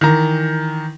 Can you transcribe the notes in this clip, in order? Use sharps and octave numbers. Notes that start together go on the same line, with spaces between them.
D#3 E3 A#5